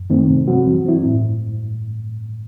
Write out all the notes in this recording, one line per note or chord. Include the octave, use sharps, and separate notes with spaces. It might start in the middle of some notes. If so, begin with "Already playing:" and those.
Already playing: F#2
D#3 A3 C4 D#4
C3
F#3 C4 F#4
E3
C4 E4
A2